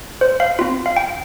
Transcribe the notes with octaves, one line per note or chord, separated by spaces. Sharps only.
C5
F5
C4 F4
F5
G5